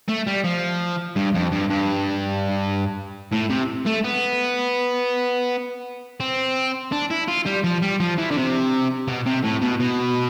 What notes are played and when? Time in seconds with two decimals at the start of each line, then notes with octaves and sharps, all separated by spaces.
0.08 A3
0.27 G3
0.44 F3
1.16 G2
1.35 F2
1.52 G2
1.70 G2
3.33 A2
3.50 C3
3.87 A3
4.04 B3
6.20 C4
6.92 D4
7.10 E4
7.28 F4
7.46 G3
7.64 F3
7.82 G3
8.00 F3
8.18 E3
8.31 D3
8.36 C3
9.08 B2
9.26 C3
9.44 A2
9.62 B2
9.80 B2